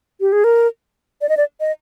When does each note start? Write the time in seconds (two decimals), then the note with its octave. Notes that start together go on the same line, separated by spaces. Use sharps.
0.21 G4
0.32 G#4
0.44 A#4
1.21 D5
1.29 D#5
1.37 D5
1.60 D#5